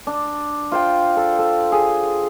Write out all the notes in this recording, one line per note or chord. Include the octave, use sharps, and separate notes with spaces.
D4
F4 C5 G5
A4
A4
G#4